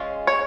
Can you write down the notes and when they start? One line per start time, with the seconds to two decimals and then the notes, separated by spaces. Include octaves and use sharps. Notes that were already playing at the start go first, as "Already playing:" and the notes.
Already playing: G#3 C#4 F4
0.27 C#5